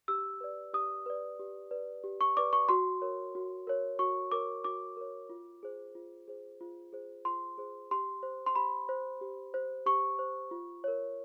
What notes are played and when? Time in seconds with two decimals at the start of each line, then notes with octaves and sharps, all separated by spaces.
0.08 G4 E6
0.41 B4 D5
0.74 G4 D#6
1.06 B4 D5
1.39 G4
1.71 B4 D5
2.04 G4
2.21 C#6
2.37 B4 D5 D6
2.53 C#6
2.69 F#4 C6
3.02 A#4 C#5
3.35 F#4
3.67 A#4 C#5
3.99 F#4 C#6
4.32 A#4 C#5 D6
4.64 F#4 D6
4.97 A#4 C#5
5.29 F4
5.63 G#4 C5
5.95 F4
6.28 G#4 C5
6.61 F4
6.93 G#4 C5
7.25 F4 C6
7.58 G#4 C5
7.91 G4 C6
8.23 C5
8.46 C6
8.55 G4 B5
8.89 C5
9.21 G4
9.54 C5
9.86 G4 C#6
10.19 C5
10.51 F4
10.84 A#4 C#5